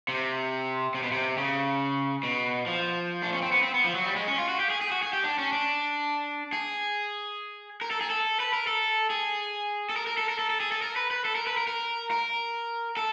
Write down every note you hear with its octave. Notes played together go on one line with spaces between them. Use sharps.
C3
C3
B2
C3
C#3
B2
F3
D4
C#4
C4
B3
C4
B3
F3
F#3
G3
G#3
C#4
F4
F#4
G4
G#4
G#4
F#4
G#4
G4
D4
C#4
D4
G#4
A#4
A4
G#4
A4
B4
A#4
A4
G#4
A4
A#4
A#4
A4
A#4
A4
A4
G#4
A4
A#4
B4
B4
A4
A#4
B4
A#4
A#4
A#4
A4